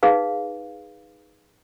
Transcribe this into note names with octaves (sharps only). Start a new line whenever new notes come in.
D#4 G#4 B4 F5